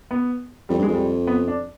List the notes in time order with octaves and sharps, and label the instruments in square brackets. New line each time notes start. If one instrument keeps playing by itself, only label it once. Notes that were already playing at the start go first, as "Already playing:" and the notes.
[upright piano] B3
[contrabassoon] F2 [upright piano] G3
[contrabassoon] G2 [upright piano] G#3
[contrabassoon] F2
[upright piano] G3
B3
D4